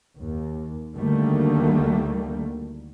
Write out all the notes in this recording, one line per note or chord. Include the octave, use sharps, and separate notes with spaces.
D#2
D2 D3 D#3 G3 A3 A#3